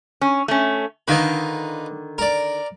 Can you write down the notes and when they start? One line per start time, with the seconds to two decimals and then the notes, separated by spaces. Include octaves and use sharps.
0.21 C#4
0.48 A3 C#4
1.08 D3 D#3 D#4 F4 B4
2.18 A#4 D5